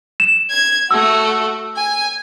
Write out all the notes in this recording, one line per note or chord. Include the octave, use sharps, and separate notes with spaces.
E7
G#6
A3 F#4 E6
G#5